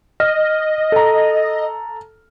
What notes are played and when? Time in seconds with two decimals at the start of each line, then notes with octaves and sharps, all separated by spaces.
0.20 D#5 F6
0.92 A4 A#5